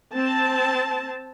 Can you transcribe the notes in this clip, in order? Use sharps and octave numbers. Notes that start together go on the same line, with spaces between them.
C4 A5